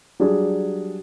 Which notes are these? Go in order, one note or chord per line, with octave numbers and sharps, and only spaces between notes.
F#3 G3 D4 G#4